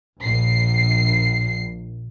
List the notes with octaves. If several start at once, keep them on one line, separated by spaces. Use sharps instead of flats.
A#1 C7